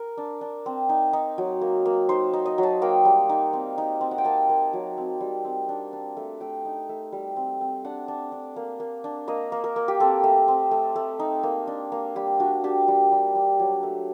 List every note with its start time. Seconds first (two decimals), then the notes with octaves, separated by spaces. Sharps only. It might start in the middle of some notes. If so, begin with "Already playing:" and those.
Already playing: A#4
0.18 D4
0.41 D4
0.66 C4
0.89 D#4
1.13 D#4
1.38 F#3
1.61 A#3
1.85 A#3
2.09 D#4 C5
2.33 D#4
2.46 D#5
2.58 F#3
2.63 A5
2.82 A#3 G5
3.05 G3
3.29 D#4
3.53 C4
3.78 D#4
4.01 C4
4.11 F#5
4.18 G5
4.25 A#3 A5
4.49 A#3
4.73 F#3
4.98 C4
5.21 G3
5.45 C4
5.69 D4
5.93 D4
6.17 A3
6.40 A3 G5
6.65 D#4
6.89 A3
7.12 G3
7.36 C4
7.61 C4
7.84 D4 F#5
8.08 D4
8.32 D4
8.56 A#3
8.80 A#3
9.04 D4
9.28 A#3 D#5
9.52 A#3
9.64 A#4
9.76 A#3
9.88 G4
10.00 C4 A4
10.24 A3
10.48 C4
10.71 A3
10.96 A3
11.20 D#4
11.43 A#3
11.67 D4
11.92 A#3
12.16 G3 G4
12.40 D4 F#4
12.64 D4 G4
12.88 G3
13.12 G3
13.35 G3
13.59 F#3
13.83 A3